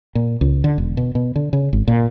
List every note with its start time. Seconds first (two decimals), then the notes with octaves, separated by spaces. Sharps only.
0.15 A#2
0.41 C#2
0.64 D3
0.78 E1
0.97 B2
1.15 B2
1.36 D3
1.53 C#3
1.73 G#1
1.88 A#2